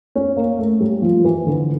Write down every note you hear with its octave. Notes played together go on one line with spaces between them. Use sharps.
C#4
A#3
A3
G3
F3
E3
D3